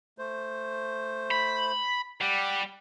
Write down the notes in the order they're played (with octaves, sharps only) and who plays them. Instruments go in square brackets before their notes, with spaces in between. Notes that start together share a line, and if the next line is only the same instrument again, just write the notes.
[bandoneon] A3 C5
[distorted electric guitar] B5
[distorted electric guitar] G3 [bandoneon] G4 F#5